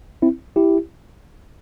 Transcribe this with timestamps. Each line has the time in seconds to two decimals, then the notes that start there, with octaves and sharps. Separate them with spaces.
0.22 C4 E4
0.56 E4 G4